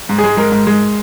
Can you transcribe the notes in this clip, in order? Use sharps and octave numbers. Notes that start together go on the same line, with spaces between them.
G#2
G#4
G#3
G#3 A#4
G#2
G#3